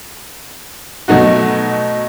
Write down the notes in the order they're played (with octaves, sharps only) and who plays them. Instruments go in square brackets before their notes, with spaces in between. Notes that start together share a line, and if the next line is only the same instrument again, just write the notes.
[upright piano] B2 F#3 A3 D#4 F#4